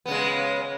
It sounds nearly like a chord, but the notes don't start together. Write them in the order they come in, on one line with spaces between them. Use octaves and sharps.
B3 C#3 G#3